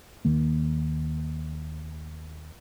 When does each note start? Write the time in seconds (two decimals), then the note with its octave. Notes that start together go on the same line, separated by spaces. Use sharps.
0.25 D#2 D#3 A#3